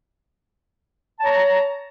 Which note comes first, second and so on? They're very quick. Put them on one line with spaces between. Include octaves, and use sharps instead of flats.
A5 C#5 A#5